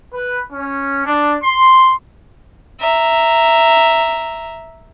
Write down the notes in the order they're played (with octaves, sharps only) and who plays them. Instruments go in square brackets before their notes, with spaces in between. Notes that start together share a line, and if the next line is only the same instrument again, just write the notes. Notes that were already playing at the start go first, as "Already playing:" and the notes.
[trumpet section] B4
C#4
D4
C6
[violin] E5 A#5